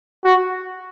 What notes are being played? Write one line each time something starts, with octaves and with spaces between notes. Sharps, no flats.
F#4